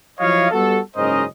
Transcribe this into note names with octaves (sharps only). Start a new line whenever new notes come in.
F3 F#3 E4 C#5 D#5 F5
G3 B3 F#4 A4
F#1 G#2 C#4 A#4 C5 D#5